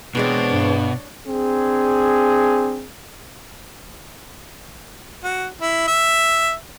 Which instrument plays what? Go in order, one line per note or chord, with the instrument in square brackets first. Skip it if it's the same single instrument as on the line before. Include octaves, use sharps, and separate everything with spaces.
[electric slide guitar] B2 [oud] E3 G#3 C4 [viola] D4 C#5
[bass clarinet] G2
[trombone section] C4 D4 G#4
[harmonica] F#4
E4
E5